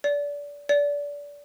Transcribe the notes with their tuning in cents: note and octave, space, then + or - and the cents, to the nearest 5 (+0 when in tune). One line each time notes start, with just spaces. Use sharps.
D5 -25
D5 -25